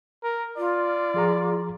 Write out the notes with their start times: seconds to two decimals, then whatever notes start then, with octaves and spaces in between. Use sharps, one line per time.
0.23 A#4
0.57 F4 D5
1.14 F3 G#4 A#5